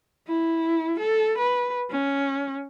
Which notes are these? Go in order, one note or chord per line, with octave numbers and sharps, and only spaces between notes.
E4
A4
B4
C#4